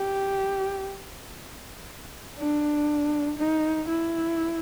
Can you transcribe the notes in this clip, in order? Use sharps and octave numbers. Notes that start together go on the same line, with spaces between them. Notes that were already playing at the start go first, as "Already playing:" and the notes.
Already playing: G4
D4
D#4
E4